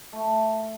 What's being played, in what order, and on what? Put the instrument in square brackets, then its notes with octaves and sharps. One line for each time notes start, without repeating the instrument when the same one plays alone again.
[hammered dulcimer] A3